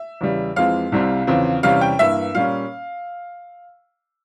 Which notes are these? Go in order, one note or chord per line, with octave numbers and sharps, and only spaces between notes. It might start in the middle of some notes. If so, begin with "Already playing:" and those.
Already playing: E5
E2 C#3 G3
F2 E3 G#3 C4 F5
C2 C3 G3 C4
E2 C#3 F3 C4
E2 C3 G3 C#4 F5
G5
G2 E3 A#3 E5
A#2 G3 A#3 C#4 F5